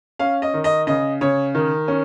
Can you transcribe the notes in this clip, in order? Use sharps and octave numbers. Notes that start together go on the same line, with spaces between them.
C#4 F5
D#5
D#3
D#5
C#3 D#5
C#3 C#5
D#3
C#4